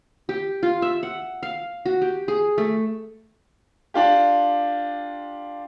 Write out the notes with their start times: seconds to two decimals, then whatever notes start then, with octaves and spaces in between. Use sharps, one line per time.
0.29 G4
0.63 F4
0.82 E5
1.03 F#5
1.43 F5
1.86 F#4
2.02 G4
2.28 G#4
2.58 A3
3.94 D4 F4 G4